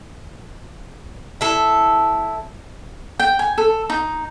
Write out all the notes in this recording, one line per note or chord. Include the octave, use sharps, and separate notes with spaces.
E4 A4
G5
G#5
A4
D#4